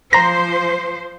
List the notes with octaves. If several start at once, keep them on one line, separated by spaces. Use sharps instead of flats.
F3 C5 A#5 A#6